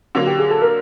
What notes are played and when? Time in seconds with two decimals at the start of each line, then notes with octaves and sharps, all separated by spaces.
0.15 D3 F#3 A#3 F#4
0.26 G4
0.39 G#4
0.50 A4
0.62 A#4